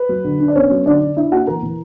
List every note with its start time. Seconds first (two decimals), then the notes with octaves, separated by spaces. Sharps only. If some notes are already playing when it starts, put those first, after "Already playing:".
Already playing: B4
0.09 F#3
0.24 D3
0.40 D4
0.48 D5
0.55 B3 C#4 C#5
0.71 F#3
0.85 D3 D4 D5
1.01 D4
1.17 D4 E4 E5
1.31 A#3 F#4 F#5
1.47 E3 A#4 A#5
1.63 E3